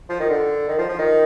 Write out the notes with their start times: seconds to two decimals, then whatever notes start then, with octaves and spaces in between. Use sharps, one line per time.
0.09 F3
0.20 D#3
0.30 D3
0.68 D#3
0.78 F3
0.88 F3
0.98 D#3